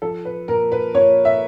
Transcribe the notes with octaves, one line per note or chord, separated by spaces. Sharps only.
F3 A4
B4
A#2 A#4
B4
A#2 C#5
E5